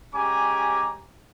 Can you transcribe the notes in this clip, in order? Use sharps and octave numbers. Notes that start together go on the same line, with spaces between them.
G#3 C#4 G4 G#5 A#5 D6